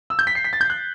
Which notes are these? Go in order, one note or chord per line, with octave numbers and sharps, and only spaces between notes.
E6
G6
B6
C7
B6
A6
G6
F#6